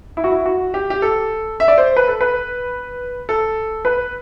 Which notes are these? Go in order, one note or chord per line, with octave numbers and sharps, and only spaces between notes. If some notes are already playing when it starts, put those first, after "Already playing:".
E4
F#4
E4
F#4
G4
G4
A4
E5
D5
C5
B4
A4
B4
A4
B4